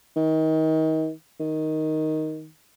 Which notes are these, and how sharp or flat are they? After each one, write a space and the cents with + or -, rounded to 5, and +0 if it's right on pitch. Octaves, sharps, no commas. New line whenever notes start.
D#3 +30
D#3 +5